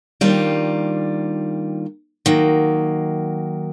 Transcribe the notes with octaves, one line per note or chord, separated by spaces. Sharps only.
D#3 G3 A#3 D4 F4
D#3 F#3 A#3